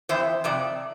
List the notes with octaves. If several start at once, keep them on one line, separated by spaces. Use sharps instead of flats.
F2 E3 C5 E5
F2 C3 D5